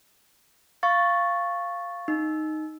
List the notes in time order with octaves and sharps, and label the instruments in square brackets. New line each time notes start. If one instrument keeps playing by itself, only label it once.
[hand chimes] F5 C#6 A6
D#4